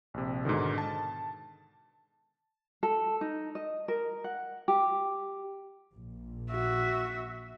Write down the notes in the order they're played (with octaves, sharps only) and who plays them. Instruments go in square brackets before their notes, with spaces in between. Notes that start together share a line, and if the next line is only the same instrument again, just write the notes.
[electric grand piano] A#1 C3
G#2 B2 D3 D#3
A5
[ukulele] A4
D#4
D#5
A#4
F#5
G4
[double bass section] A#1
[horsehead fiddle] F#4 E5